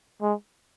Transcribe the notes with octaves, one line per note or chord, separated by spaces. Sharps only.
G#3